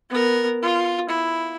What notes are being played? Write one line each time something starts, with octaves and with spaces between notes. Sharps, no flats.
B3 A#4
F4
E4